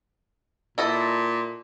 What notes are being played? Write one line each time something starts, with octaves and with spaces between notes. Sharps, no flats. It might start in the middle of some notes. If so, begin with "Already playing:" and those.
A#2 E4 A4 D#5